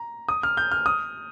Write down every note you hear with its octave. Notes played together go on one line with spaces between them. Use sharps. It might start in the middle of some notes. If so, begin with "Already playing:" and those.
Already playing: A#5
D#6
F6
G6
F6
D#6